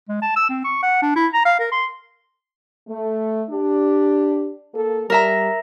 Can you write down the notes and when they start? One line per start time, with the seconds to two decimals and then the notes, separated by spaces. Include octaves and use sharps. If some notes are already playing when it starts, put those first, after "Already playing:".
0.09 G#3
0.22 A5
0.36 E6
0.49 C4
0.64 C#6
0.83 F#5
1.02 D4
1.16 E4
1.34 A#5
1.45 F5
1.60 A#4
1.72 C6
2.89 A3
3.50 D4 G4
4.74 A#3 A4
5.10 G3 A#4 E5 A#5